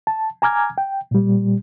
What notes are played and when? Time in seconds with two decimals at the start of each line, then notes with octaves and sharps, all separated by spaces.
0.07 A5
0.42 G#5 A#5 D6 F6 G#6
0.78 G5
1.11 A#2 G3